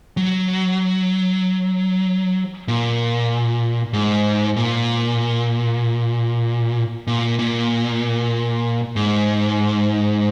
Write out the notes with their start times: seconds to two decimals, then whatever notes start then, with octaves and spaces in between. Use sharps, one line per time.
0.17 F#3
2.68 A#2
3.93 G#2
4.56 A#2
7.07 A#2
7.39 A#2
8.96 G#2